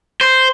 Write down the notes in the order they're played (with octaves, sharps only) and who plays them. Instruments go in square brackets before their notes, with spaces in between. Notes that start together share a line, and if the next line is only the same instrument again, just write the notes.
[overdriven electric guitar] C5